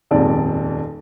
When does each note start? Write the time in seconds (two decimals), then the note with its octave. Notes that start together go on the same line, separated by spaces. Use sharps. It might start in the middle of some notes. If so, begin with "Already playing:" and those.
0.11 D#1 F2 G#2 D5